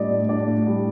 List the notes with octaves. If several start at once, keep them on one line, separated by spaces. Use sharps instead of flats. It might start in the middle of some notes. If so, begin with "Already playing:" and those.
Already playing: A2 G3 D4 D5 D#5
A2
D4 D5
A2
G3